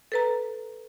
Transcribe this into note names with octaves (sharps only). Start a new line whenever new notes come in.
A4 B4 A#5